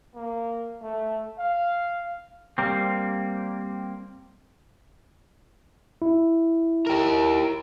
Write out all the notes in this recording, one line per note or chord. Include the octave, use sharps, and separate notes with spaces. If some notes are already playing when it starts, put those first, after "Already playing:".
A#3
A3
F5
G3 A#3 C4
E4
G4 A#4